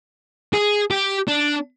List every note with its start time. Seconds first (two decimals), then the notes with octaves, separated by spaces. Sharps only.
0.54 G#4
0.91 G4
1.28 D4